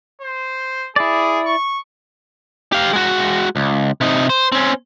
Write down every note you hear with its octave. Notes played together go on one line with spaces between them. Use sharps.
C5
E4 G#4 D5
C#6
G4 F5
G#3 F#4
C#2
C3 D#4
C5
C4 C#4